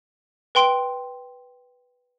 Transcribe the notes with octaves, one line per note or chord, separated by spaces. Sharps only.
B4 G5 C6 D7